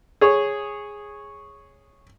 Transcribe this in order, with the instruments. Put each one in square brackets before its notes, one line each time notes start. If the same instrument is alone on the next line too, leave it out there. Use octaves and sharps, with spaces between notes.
[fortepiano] G#4 C#5